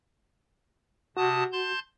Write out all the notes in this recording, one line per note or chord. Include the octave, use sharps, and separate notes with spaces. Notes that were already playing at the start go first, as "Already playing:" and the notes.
C3 F#4 A5 D#6
A5 C6 G6